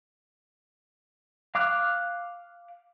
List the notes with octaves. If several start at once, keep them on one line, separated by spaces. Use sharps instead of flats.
F5 D6 F6 F#6